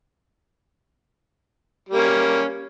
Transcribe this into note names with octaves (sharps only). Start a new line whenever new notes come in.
G3 A#3 C#4